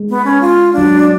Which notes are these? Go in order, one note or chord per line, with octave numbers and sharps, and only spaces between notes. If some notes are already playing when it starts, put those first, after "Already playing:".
Already playing: G#3
B3
C#4
F4
D4
F#3
G#3